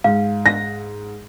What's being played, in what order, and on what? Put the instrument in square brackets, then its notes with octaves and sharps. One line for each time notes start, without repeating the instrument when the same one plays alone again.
[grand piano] G#2 [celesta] F5
[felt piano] A#6